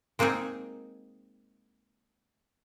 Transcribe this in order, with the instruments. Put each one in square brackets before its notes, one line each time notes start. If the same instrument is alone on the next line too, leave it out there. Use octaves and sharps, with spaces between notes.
[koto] G#3 A#3 C4 D#4 G#4